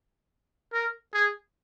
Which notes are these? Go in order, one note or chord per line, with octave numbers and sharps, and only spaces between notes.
A#4
G#4